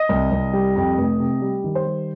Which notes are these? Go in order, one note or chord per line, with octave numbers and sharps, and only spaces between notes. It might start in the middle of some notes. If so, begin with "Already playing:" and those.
Already playing: D#5
C2
C2
G3
F2
F1
C3
G3
D#3
C5
G3